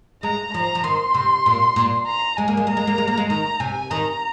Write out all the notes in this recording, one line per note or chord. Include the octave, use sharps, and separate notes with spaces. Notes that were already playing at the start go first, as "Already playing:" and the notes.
G#3 A#5
F3 A#5
F3
D#3 C6
C3
A#2
A#2
A#5
G#3 G#5
A#3
G#3
A#3 A#5
G#3
A#3
G#3
A#3
G#3
D#3 A#5
C3 G#5
D#3 A#5